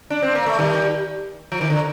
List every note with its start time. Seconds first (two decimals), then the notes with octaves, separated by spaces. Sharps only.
0.10 D4
0.22 C4
0.35 A#3
0.46 A3
0.59 D#3 G3
1.52 F3
1.61 D#3
1.70 D3